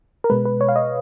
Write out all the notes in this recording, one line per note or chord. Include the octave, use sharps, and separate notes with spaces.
A#4
B2 G#3 B4
B4
C#5
F5
D#5